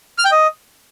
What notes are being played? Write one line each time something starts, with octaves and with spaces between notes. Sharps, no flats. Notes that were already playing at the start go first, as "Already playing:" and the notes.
F6
G5
D#5